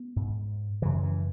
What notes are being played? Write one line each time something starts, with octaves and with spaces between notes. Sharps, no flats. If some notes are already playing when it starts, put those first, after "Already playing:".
Already playing: B3
G#2
F#2 C#3 E3
E3